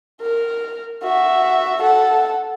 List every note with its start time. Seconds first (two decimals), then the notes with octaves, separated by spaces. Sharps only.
0.22 A#4
1.03 F#4 E5
1.82 A4 F#5